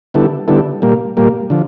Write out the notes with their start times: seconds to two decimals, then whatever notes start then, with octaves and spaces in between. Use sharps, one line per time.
0.14 D3 G3 B3 E4 A4
0.48 D3 G3 B3 E4 A4
0.82 A#2 G3 A#3
1.17 A#2 G3 A#3
1.50 D3 F3